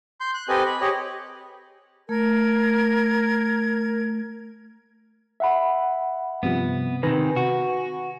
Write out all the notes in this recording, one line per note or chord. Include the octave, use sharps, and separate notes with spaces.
C6 G6
F#6
C4 G4 A4 B4 D#5 G#5
B5
G4 G#4 C#5 D#5
A3 A#4 G#6
E5 F#5 B5
G2 C3 F3 B3
C3 D#3 B4 G#5 B5 A#6
F#4